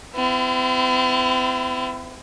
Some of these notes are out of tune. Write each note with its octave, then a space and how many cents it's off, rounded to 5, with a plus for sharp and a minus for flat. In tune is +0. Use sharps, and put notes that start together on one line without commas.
C4 -40 E4 +30